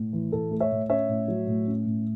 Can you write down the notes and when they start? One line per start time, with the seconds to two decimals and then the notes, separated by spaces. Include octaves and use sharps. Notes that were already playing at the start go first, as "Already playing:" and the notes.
Already playing: A2
0.13 E3
0.32 A2 A4
0.51 A3
0.60 C#5 E5
0.71 A2
0.90 C#4 C#5 E5
1.09 A2
1.28 F#3
1.47 A2
1.67 C#4
1.86 A2